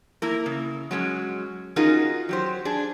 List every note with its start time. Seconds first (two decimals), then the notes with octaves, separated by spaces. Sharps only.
0.22 A#3 E4 A#4
0.46 C#3
0.91 F#3 G#3 B3 C#4
1.76 C#4 D#4 F4 F#4 G#4 A#4
2.29 F#3 G4 C5
2.65 D4 G#4